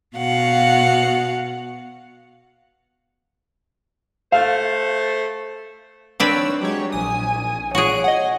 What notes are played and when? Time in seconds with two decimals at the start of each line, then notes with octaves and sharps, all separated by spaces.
0.17 B2 F#4 F5 F#5
4.32 A3 C5 F5
6.20 D#3 C4 D4 B4 C#5 E6
6.61 F#3 G#3 G4 C#5
6.92 A#1 G#5 D#6
7.75 A#2 F#4 G#4 C#5 F#6 D7
8.04 D#5 F#5 G#5